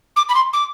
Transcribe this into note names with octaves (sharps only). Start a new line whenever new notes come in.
D6
B5
C6
D6